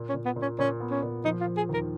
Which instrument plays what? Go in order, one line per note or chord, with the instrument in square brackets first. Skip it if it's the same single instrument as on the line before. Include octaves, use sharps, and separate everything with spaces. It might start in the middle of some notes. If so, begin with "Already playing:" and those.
Already playing: [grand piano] A#2
[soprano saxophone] C#4
[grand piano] A#2
[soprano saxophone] B3
[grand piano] A#2
[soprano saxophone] C#4
[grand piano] A#2 [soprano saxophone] C#4
[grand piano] B3
[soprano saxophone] C#4
[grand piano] A#2
[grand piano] F3 [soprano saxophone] D#4
[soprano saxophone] F4
[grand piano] F3
[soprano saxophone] G#4
[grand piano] D#2 [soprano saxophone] A#4